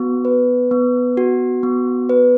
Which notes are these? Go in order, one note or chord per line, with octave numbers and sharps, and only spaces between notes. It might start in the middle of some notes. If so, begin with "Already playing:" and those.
Already playing: B3 F#4
B4
B3
F#4
B3
B4